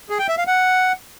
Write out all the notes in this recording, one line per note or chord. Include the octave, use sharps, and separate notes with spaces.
G#4
G5
E5
F5
F#5